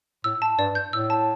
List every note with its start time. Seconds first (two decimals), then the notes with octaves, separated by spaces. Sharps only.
0.24 A2 E6
0.42 A5
0.58 G2 D5
0.75 G6
0.93 A2 E6
1.10 A5